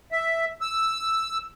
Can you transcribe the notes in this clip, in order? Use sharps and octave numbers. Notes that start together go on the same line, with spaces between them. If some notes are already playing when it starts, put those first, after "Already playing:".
E5
E6